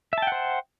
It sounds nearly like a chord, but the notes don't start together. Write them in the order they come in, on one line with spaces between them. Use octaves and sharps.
E5 A5 G5 F#5 C5